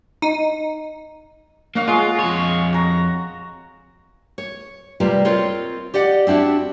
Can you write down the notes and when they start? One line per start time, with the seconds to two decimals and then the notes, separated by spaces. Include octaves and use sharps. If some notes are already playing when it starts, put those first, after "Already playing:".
0.22 D#4
1.75 F#3 A#3 F#4 F5
1.88 G#3 F4
2.19 F2 C#5
2.73 F#4 A#5
4.38 C#5
5.00 C3 G3 A#3 F4 G4 B4
5.25 C4 F4 A#4 C5 C#5 D#5
5.94 G4 D5 D#5 F#5
6.27 C4 D4 E4 F#4 G4